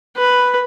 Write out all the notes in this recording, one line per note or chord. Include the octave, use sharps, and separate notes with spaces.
B4